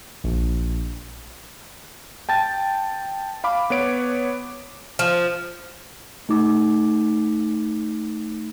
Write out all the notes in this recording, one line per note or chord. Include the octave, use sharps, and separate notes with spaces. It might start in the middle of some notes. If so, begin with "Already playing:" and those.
A#1
G5 A5 A6
F5 B5 D6
B3 B4 C#5 D7
F3
A3 D#4 D6